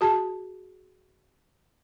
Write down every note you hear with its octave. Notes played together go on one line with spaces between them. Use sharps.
F#4 G#4 A5